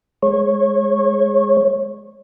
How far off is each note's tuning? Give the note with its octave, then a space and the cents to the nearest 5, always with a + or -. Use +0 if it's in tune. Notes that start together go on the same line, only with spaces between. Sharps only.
G#3 +0 C#5 -25